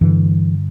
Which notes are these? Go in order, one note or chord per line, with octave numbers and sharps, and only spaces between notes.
G2 D3 E3